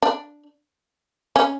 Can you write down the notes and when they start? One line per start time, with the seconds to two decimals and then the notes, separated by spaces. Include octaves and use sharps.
0.02 D4
1.36 C#4